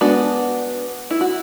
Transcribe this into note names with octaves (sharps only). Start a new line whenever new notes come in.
G#3 B3 D4 F#4
E4
F#4